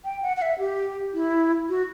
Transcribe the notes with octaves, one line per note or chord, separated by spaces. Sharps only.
G5
F#5
F#5
E5
G4
E4
F#4